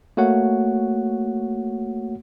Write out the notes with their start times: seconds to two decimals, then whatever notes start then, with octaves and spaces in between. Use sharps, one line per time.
0.17 A3 A#3 F#4 C#5 F#5